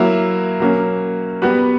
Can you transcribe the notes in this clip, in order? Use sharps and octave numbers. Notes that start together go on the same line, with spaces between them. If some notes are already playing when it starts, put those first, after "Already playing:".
Already playing: F#3 A#3 E4
F#3 A#3 C#4
G3 B3 F#4 B4